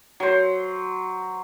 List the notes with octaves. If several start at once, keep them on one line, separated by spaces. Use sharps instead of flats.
F#3 C5